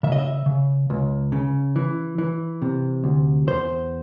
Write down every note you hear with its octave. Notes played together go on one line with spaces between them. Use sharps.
C#3 E5
D#5
E5
C#3
C#2
C#3
E3
E3
C3
D2
E2 C5